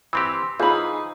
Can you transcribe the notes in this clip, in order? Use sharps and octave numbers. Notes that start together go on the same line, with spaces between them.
E3 C4 G4 C6 E6
E3 D#4 F4 G#4 C5 B5